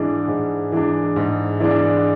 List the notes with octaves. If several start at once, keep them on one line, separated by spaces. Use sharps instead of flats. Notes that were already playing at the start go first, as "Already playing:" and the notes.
Already playing: G#2 E3 G#3 D4
G#2
E3 G#3 D4
G#2
E3 G#3 D4 D5